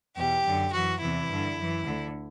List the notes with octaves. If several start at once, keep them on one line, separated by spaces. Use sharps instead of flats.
E2 B2 G4
F#2 D3
F#2 E3 F#4
E2 C3 E3 E4
G2 D3
F#2 E3
D2 D3